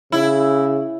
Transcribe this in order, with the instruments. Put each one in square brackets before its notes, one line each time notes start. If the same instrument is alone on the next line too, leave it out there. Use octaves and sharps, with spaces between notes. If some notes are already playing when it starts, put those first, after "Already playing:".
[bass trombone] C#3 [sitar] E4